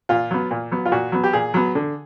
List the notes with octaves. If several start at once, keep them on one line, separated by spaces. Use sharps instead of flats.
A#2 F4
F#3 B3
A#2
F#3 B3
F4
A#2 F#4
F#3 B3
G4
A#2 G#4
F#3 B3
D3